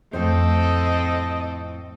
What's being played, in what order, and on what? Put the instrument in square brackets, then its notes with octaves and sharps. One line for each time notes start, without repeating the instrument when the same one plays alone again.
[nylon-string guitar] F2 A2 C5 [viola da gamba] C4 A4 [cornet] D#5